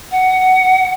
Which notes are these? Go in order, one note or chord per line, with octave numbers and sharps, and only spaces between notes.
F#5